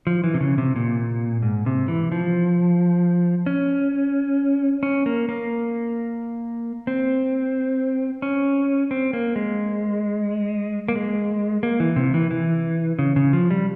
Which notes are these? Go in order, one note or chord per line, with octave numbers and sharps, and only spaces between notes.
F3
E3
C3
C#3
C3
A#2
G#2
C3
E3
F3
C#4
C#4
A#3
A#3
C4
C#4
C4
A#3
G#3
A#3
G#3
A#3
E3
C3
E3
E3
C#3
C#3
F3
G3